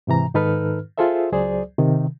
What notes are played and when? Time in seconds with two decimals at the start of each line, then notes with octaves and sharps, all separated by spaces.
0.07 G#2 C3 E3 A#5
0.34 G#2 D#3 D#4 A4 B4 F6
0.98 F4 G#4 A4 C5 E5
1.32 C#2 F#3 G#4 C5 D5
1.79 C3 D#3